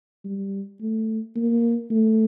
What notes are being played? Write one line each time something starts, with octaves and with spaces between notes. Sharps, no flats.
G3
A3
A#3
A3